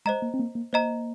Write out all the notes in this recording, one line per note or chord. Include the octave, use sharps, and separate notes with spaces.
G#3 C5 D#5 A#5
A#3
C4
A#3
A#3
A#3 C5 D#5 A#5